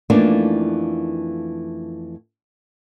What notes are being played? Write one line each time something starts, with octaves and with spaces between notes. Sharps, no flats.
F2 E3 A3 A#3 D4 D#4